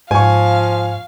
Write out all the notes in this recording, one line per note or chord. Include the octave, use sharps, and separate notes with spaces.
G#2 F3 F5 G#5 C#6